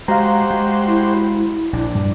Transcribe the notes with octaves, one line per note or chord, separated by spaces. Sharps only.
G#3 F#4 G4 C5 F5 A#5
G#3
E4
A#1 D4
G2